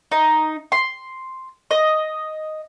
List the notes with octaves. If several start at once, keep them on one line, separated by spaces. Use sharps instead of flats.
D#4
C6
D#5